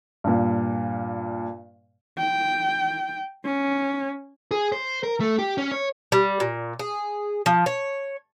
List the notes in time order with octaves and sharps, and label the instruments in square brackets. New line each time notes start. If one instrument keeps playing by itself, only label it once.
[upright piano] G2 A#2
[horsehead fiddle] G5
C#4
[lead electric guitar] G#4
C5
A#4
A3
G4
C#4
C#5
[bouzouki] G3
A#2
G#4
F3
C#5